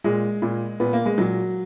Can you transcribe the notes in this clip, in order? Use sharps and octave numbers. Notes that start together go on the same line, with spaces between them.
A#2 G#3
A#2
A#2 B3
A#3
G#3
A#2 F#3